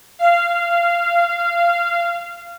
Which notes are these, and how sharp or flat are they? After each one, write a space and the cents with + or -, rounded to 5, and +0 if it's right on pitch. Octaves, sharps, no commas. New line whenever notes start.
F5 -20